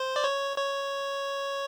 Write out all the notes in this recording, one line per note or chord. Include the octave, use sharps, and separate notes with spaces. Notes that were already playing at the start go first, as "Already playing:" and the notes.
Already playing: C5
D5
C#5
C#5